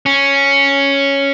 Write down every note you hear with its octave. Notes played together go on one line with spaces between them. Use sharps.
C#4